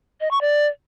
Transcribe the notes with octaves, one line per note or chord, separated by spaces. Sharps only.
D#5
C#6
D5